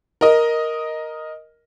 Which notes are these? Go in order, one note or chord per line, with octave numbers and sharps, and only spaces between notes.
A#4 D#5